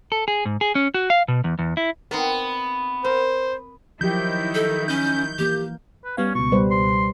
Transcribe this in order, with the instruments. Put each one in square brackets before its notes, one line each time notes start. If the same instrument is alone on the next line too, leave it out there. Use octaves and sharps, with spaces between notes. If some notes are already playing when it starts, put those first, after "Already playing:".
[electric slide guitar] A4
G#4
G#2
G#4
C#4
F#4
F5
B2
E2
E2
E4
[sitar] B3 [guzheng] C4 D#4 A#4
[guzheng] A#4 [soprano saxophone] C5
[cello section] D#3 D#4 E4 [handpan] F3 F#3 G4 [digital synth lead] G6
[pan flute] A4
[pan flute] C#4 [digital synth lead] G6
[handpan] E3 A#3 [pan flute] G4
[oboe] B4
[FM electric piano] G3 B3 F5 [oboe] C#4
[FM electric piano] C#2 B2 [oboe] C#6
[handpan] G3 B4 C5
[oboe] C6